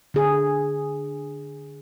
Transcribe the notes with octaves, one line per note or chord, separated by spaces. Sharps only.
D3 G#4